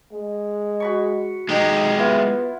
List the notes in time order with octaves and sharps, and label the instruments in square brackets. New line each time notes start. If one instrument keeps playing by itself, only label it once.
[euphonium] G#3
[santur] F#4 B5 C#6
[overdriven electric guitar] G#3 G4 [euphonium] D#4
[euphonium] B3 [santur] E4 F4 F#5